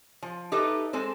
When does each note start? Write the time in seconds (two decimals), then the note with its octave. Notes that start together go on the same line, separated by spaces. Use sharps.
0.22 F3
0.52 D#4 G4 A4 B4 D#5 E5
0.93 G#3 C4 A4 C5